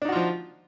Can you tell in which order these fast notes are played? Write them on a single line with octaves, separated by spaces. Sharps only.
D4 D#4 F#4 F4 F3